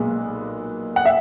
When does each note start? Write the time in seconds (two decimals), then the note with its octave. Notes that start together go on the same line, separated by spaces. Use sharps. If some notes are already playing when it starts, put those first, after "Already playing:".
Already playing: B1 A#2 G#3 B3
0.96 F#5
1.05 E5